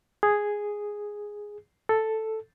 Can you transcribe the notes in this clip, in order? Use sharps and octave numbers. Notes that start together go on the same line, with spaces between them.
G#4
A4